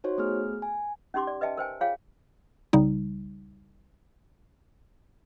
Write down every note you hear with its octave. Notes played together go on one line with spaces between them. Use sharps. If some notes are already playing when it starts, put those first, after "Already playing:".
D#4 F#4 C5 C#5
A3 B3 G#4 F6
G#5
C#4 D#4 G4 C6 D6
D5
B4 D#5 E5 G5 A5
A#4 C5 G5 G#5
F4 G#4 C#5 F5 G5 G#5
C2 C#3 G3 D#4